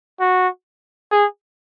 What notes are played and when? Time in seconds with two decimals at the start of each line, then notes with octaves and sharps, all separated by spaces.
0.20 F#4
1.12 G#4